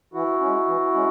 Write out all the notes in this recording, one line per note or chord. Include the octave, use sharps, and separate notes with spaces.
E3 E4 F#4
C#4
G#3
E3
G#3 C#4